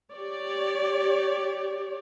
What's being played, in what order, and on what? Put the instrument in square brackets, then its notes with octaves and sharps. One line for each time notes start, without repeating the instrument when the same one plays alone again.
[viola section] G4 C#5 D5